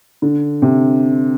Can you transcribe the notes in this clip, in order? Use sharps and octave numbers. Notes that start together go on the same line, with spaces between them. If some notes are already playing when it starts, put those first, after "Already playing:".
D3
C3